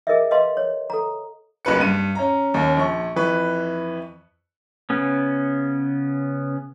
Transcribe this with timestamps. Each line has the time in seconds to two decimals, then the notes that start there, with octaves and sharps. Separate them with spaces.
0.07 G#4 A#4 D#5 E5
0.31 B4 D#5 F5 A5 C6
0.57 C#5
0.90 A4 A#5
1.65 F#1 B1 B4 C#7
1.80 G2 D#7
2.15 C#4 A#5
2.54 D#2 C#4
2.77 A#1 C#6
3.16 F2 E3 B4 C#6
4.90 C#3 B3 C#4